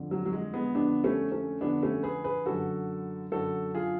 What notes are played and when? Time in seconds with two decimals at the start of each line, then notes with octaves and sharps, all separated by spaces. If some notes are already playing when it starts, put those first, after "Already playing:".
Already playing: F2 D3
0.11 F#3
0.25 F#3
0.33 G#3
0.53 G#3 B3
0.75 F2 D3 B3 D4
1.04 A3 C#4
1.32 A3 C#4
1.60 F2 D3 B3 D4
1.83 A3 C#4
2.03 G#4 B4
2.24 G#4 B4
2.46 F#2 D3 F#4 A4
3.32 F#2 D3 F#4 A4
3.75 F4 G#4